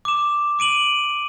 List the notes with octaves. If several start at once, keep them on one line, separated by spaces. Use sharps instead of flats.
D6 E7
D6 D7 D#7 F#7